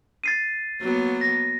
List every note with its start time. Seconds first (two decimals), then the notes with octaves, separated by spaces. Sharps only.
0.24 A6 C7 D#7
0.81 F#3 A#3 B3
1.21 A#6